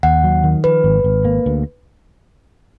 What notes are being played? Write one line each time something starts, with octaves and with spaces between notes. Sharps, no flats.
D#2 F#5
F#3
D#3
F3 B4
G#1
G#1
A#3
D2